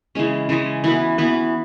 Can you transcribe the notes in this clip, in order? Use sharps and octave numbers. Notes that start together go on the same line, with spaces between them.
C#3 E3 G#3 C#4
C#3 E3 G#3 C#4
E3 B3 F#4 B4
E3 B3 F#4 B4